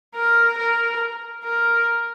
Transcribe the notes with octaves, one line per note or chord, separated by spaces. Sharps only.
A#4
A#4
A#4